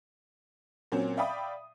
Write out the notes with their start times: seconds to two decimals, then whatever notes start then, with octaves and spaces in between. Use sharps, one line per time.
0.92 A#2 F#3 C4 C#4
1.17 D5 E5 F5 G5 B5 D#6